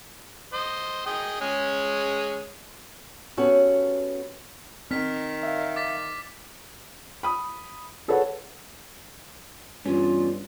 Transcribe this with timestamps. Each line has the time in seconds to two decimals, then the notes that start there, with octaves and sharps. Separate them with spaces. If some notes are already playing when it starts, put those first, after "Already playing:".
0.53 C5 D#5
1.06 G#4 D#5 G5
1.41 G#3 C#4 G#4
3.37 B3 C#4 F#4 G4 A4
4.91 D#3 C4 F6 B6
5.43 E5 F5
5.76 D6 A6 B6
7.23 B5 D#6
8.08 G#4 A4 B4 C#5 F#5
9.86 E2 G2 C#4 F4